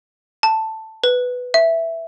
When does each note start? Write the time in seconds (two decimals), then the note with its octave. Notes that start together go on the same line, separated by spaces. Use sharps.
0.43 A5
1.04 B4
1.54 E5